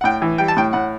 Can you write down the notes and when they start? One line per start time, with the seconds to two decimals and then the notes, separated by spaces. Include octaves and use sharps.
0.01 F#5
0.04 A2 G5
0.22 E3
0.38 G3 G5
0.48 A5
0.57 A2 G5
0.73 A2 F#5